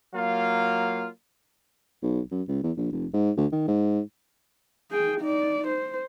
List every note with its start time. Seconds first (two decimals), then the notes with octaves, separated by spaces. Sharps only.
0.13 F#3 A#3 F4 F5
2.02 B1
2.31 F#2
2.48 C#2
2.63 E2
2.77 A#1
2.92 F1
3.13 G#2
3.37 D2
3.52 D#3
3.68 G#2
4.91 G#4 G5
5.20 D#4 D5
5.67 C5